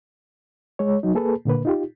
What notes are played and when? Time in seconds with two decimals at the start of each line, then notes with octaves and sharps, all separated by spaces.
0.79 G#3 C#5
1.03 F#3 D#4
1.15 A#3 G#4 A4 B4
1.45 A#2 D3 A#3 B4
1.65 D#4 F4 G4